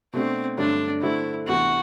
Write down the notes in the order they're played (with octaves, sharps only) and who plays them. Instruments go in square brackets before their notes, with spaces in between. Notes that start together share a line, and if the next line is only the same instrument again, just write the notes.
[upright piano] B2 A3 D4 F#4 [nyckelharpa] C4
[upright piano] G2 D3 F#3 A3 [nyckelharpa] D4
[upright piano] D3 A3 C4 F#4 A4 [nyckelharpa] E4
[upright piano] D2 C3 E3 B3 E4 [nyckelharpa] F#4